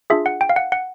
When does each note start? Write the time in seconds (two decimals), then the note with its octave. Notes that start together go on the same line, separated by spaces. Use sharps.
0.10 D4 F4 G#4 E5
0.26 F#5
0.41 G5
0.50 F5
0.56 F#5
0.72 F#5